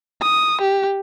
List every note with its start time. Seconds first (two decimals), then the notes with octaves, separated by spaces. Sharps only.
0.22 D#6
0.61 G4